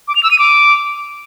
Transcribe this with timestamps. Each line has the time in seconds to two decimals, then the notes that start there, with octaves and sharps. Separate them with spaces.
0.08 D6
0.15 F7
0.23 E6
0.31 D#7
0.39 D6